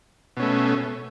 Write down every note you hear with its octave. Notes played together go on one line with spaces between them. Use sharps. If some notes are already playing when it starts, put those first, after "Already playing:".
B2 A3 C#4